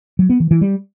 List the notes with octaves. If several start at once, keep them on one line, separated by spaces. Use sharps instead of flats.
F#3
B3
E3
E3
G3